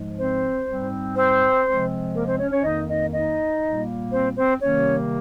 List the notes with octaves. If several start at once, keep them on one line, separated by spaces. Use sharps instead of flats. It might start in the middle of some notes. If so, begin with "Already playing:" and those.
Already playing: G#2 F3 G#3
C4 C5
G#2 G3 C4
C4 C5
C3 F3 G#3 C4
A#3 A#4
C4 C5
C#4 C#5
C#4 C#5
F2 D#3 A#3 D#4 D#5
D#4 D#5
D#4 D#5
A#2 G3 A#3
C4 C5
C4 C5
C3 D#3 G3 A#3 C#4 C#5